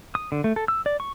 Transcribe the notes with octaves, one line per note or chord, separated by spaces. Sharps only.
D#6
D3
A3
A4
E6
D5
C#6